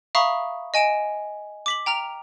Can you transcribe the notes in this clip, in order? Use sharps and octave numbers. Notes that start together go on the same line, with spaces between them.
E5 F5 A#5 B5 C#6 D#6
D#5 G#5 D7 E7
D6 B6 F#7
G5 A#5 F6 F7